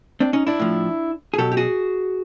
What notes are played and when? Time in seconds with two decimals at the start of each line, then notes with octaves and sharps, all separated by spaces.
0.20 C4 D4
0.33 C#4 D#4
0.47 D4 E4
0.59 A2 F3
1.34 G#4
1.38 B2 F#3 G4 A4
1.52 G4
1.57 F#4 G#4